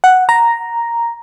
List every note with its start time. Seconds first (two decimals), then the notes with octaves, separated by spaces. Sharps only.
0.04 F#5
0.29 A#5